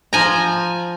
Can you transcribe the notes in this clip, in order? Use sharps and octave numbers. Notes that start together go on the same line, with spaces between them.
F3 G#5 A#5